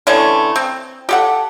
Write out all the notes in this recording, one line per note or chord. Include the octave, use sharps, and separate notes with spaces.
D3 E3 A3 C#4
C4
G4 A4 F#5